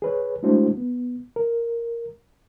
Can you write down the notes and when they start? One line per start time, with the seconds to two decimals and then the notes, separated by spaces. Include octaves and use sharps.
0.02 G#4 B4 C#5
0.43 G#3 A3 D4 E4 F#4 C5
0.77 B3
1.36 A#4